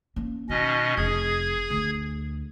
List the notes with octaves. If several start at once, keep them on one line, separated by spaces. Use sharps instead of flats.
A#3 C#4
B2 D#3 C#4 D#5
F1 G#4 G#6
D2